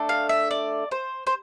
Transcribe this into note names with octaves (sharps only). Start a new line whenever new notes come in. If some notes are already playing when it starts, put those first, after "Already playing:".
Already playing: A3 D4 A4
F5
E5
D5
C5
C5